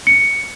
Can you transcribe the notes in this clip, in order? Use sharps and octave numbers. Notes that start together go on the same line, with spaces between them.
C#7